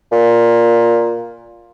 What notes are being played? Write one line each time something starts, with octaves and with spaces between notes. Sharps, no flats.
A#2